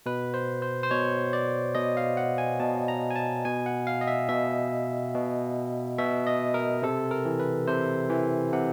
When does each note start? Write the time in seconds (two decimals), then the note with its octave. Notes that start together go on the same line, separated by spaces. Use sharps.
0.06 B2 B4
0.34 C5
0.62 C5
0.83 C5
0.91 B2 C#5
1.33 D5
1.75 B2 D#5
1.97 F5
2.17 F#5
2.38 G#5
2.60 B2 A5
2.88 A#5
3.10 G#5
3.16 A5
3.45 B2 G#5
3.66 F#5
3.87 F5
4.01 D#5
4.07 E5
4.29 B2 E5
5.14 B2
5.98 B2 E5
6.27 D#5
6.54 A#4
6.82 C3 A4
7.11 A#4
7.25 E3
7.40 B4
7.67 C3 C5
8.10 E3
8.52 C3 F#5